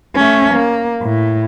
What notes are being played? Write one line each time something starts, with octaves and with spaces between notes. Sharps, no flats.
A3 C#4
A#3
A2